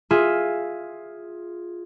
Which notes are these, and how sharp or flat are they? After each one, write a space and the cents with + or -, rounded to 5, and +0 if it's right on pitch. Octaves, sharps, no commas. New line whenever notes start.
F4 +5 G#4 +0 E5 +0